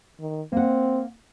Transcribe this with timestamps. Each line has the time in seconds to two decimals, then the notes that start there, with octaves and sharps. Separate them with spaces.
0.20 D#3
0.52 A#3 C4 F#5